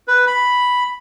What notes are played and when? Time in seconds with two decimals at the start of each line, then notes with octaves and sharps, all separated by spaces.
0.08 B4
0.27 B5